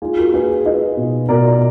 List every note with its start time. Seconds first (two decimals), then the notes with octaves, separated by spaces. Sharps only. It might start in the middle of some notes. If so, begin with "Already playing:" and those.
0.02 D#4 F4 G#4
0.18 F#4 A#4
0.34 D#4 G#4 B4
0.65 D#4 B4 D#5
0.97 B2
1.29 B2 A#4 D5